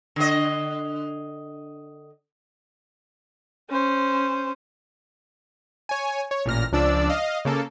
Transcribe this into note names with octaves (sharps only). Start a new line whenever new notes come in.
D3 D#5
C#4 C5
C#5 G#5
C#5
A1 A#2 F6 A#6
C#2 F3 D4 D5 E6
D#5 F5
C#3 A#3 A4